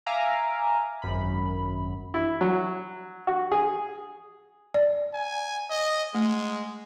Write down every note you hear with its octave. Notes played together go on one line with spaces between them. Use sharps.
E5 F5 G#5 A#5 D6 F6
G#1 F#2 B5
E4
F#3
F#4
G#4
D5
G#5
D#5
G#3 A3